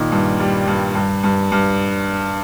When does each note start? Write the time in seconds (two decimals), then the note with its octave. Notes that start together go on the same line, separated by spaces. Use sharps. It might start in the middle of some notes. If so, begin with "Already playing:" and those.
Already playing: A#2 D#3
0.12 G2
0.40 G3
0.67 G2
0.95 G2
1.23 G2
1.52 G2